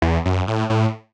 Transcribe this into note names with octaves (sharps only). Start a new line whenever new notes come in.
E2
F#2
A2
A2